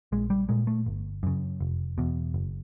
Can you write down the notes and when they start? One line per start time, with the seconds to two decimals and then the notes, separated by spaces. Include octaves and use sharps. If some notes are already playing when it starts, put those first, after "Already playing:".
0.12 A#1 G#3
0.30 G3
0.49 A#2 G#3
0.67 A3
0.86 G1
1.23 F#2 C#3
1.61 F1
1.98 E2 B2
2.34 F#1